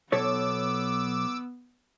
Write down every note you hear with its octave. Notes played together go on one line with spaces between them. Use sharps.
B1 B3 A4 C#5 D6 E6